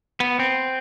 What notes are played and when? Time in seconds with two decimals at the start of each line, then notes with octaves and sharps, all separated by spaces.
0.20 B3
0.39 C4